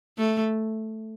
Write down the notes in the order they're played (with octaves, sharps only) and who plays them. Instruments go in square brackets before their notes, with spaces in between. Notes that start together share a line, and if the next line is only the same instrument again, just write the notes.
[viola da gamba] A3